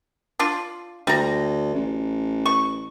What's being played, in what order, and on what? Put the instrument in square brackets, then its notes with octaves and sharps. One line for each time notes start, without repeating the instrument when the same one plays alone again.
[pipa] D4 F4
[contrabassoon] D2 [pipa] G3 A#5
[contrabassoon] A1
[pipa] C#6